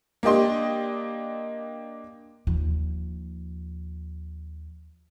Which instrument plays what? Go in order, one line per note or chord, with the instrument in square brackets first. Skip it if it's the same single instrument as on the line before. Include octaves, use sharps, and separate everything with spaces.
[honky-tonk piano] A#3 D4 G4 D#5 C6
[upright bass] D#2 F3